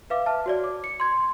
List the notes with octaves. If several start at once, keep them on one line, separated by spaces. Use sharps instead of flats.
B4 E5 F5 D6
E5 A5 F6
F#4 C#5 D5
D6
C#7
C6 G#6